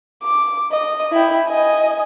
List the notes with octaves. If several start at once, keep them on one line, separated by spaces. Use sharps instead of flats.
D6
D#5
E4 G5
D#5 G#5